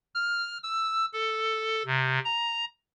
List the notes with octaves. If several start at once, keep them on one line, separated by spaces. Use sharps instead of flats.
F6
E6
A4
C3
A#5